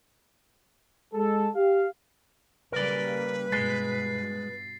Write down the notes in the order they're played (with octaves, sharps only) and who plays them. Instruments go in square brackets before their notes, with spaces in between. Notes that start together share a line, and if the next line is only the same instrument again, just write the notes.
[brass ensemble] G#3 A4
G4 F5
[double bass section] C#3 G3 A#3 [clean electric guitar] A#4 D5 [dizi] B4
[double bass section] G2 B2 [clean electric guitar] G#3 [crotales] A6 C7